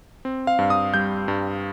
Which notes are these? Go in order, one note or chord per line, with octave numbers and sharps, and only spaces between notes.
C4
F5
G2
D#6
G3 G6
G2